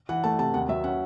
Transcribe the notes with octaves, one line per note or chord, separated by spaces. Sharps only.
E3 F#5
A3 A5
C3 A5
D#2 F#5
F#3 E5
C#4 F#5